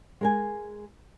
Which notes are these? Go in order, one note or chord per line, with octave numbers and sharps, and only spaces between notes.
G#3 A#4 G#5